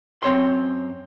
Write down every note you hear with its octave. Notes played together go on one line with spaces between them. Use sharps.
F#2 C4 C#5 C6